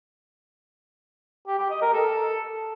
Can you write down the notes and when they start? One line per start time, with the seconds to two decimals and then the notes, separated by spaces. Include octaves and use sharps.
1.47 G4
1.58 G4
1.70 D#5
1.82 A#4
1.93 A4